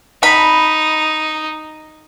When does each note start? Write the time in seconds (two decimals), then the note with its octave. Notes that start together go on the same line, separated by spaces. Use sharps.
0.23 D#4 B5